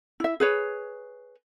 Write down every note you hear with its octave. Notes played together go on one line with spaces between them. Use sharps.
E4 E5
G#4 B4 C#5